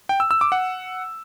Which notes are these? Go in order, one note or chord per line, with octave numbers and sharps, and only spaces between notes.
G5
E6
E6
D6
F#5